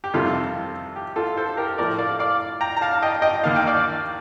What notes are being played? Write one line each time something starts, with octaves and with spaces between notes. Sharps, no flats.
G4
F2 C3 D#3 G3 F4 A4
G4
F4 A4
A4 C5
G4 A#4
A2 F3 A3 A#4 D5
D5 F5
D5 F5
G5 A#5
A#5
F5 A5
D#5 G5
D#5 G5
D#2 D#3 A#3 D4 F5
G5
D5 F5